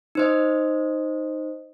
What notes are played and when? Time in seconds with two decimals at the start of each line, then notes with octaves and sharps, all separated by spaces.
0.15 D#4 C5 D#5